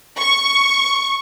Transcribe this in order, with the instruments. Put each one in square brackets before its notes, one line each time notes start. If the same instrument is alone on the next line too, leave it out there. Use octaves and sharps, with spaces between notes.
[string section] C#6